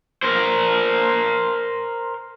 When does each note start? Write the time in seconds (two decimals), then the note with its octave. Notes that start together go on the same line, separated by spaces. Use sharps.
0.23 A#4 C5